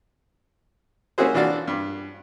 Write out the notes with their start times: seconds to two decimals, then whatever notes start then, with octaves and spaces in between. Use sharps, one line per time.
1.18 A#3 C#4 E4 F#4 G#4 C5
1.34 E3 D4 F4 F#4 D5
1.67 G2